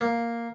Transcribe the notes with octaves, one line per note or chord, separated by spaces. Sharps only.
A#3